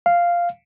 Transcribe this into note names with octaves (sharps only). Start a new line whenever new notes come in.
F5